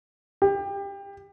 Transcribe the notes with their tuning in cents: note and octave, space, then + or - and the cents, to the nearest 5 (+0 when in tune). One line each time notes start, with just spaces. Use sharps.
G4 +25